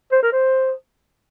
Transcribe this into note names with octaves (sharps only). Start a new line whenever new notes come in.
C5
A#4
C5